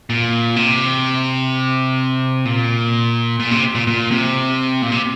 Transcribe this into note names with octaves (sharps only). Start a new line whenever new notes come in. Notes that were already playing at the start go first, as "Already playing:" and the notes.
A#2
C3
A#2
A#2
C3
A#2
A#2
C3
A#2
C3